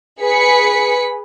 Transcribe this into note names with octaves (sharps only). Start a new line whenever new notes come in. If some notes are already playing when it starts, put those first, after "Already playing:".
G#4 B4 B6 C#7